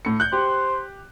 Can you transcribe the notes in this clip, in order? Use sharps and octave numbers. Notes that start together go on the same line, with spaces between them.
A2 C#7
F#6 G6
G4 C5